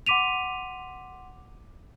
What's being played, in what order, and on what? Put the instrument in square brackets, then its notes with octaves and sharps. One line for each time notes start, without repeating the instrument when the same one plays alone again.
[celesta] F#5 C6 D6 B6 D#7 F7